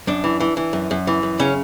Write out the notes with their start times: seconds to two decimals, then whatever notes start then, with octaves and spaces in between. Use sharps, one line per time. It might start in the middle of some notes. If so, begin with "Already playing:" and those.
0.07 F#2 D4
0.24 E3
0.40 E3
0.57 E3
0.73 F#2
0.91 F#2
1.07 E3
1.23 F#2
1.39 C#3 C#4